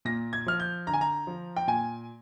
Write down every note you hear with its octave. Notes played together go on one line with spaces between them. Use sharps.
A#2 A#6
G#6
F3 F6
G6
D3 A#5
G#5
A#5
F3
G5
A#2 G#5